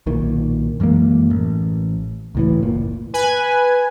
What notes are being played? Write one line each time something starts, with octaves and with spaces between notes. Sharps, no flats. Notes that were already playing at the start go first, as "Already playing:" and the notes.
B1 A#2 D#3
F#2 E3 G#3 A#3
A1
C#2 A2 E3
F#1 A#2
B4 G#5